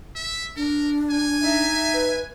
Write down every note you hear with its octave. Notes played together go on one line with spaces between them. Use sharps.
E5
D4 A#4
G#5
D#4 E5
B4